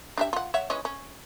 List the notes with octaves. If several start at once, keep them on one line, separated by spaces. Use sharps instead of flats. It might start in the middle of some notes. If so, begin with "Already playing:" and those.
D4 G4 E5
F4 F#5
C#5 E5 F#5
E3 G#3 C#4
C#4